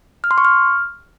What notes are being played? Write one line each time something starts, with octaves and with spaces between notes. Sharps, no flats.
F6
C6
C#6
F6